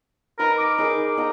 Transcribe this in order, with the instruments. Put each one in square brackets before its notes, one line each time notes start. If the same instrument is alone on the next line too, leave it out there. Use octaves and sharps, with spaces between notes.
[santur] D#4 B4 B5 [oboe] A#4
[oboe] D6
[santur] D#4 G#4 A#4
D#4 G5 A#5